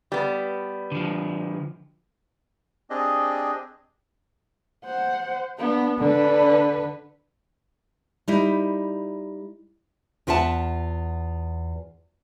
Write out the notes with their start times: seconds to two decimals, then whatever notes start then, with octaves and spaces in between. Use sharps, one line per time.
0.12 G3 B3
0.92 D3 F3
2.90 C4 D4 G4 G#4 D#5
4.85 C5 F#5
5.58 B3 D4
5.99 D3 D4 B4
8.28 G3 D#4 E4
10.27 E2 F4 E5 F#5 A5